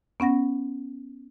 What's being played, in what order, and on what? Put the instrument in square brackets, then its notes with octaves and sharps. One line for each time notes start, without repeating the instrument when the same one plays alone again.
[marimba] B3 C#4 F#5 A#6